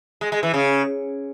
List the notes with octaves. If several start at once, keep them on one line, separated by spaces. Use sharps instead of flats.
G#3
G#3
E3
C#3